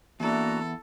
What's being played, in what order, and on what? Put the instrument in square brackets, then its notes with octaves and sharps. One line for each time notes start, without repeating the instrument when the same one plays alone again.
[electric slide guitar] E2 E4 [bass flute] A#3 [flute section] D4 F#4 A#5 [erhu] A4